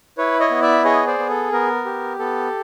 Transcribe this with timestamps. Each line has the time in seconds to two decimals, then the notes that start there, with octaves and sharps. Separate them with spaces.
0.18 E4 B4 C#5
0.40 C#5 D#5
0.51 B3
0.62 D5 E5
0.84 G#4 C#5 D#5
1.07 C5 D5
1.18 B3
1.30 A4
1.52 B3 A#4
1.85 G4
2.19 B3 A4